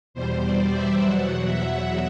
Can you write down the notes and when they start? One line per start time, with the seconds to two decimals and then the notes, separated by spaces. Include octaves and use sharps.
0.14 E2 B2 G3 C5
0.43 D5
0.73 E5
1.01 E2 B2 F#3 F#5
1.45 E5